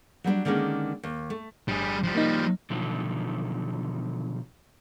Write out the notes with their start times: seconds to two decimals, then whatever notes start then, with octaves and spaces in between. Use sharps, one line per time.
0.24 F#3 G3 B3 D4
0.45 D3 D#3 G#3 A#3 C#4
1.03 D#2
1.30 A3
1.68 G1 G3 G#4
2.04 F3 G3
2.15 A#3 D#4
2.70 B2 D3 D#3 F3 F#3